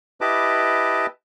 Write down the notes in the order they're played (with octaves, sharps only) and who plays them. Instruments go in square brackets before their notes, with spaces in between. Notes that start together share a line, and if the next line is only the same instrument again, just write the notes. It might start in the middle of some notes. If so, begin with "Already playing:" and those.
[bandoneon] E4 G4 B4 D#5 A5 D6